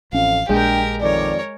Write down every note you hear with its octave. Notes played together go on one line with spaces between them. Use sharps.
A1 F2 C#4 F5
A#1 G#3 D4 G4 A#4 G5
F2 D#3 A#4 C#5 D5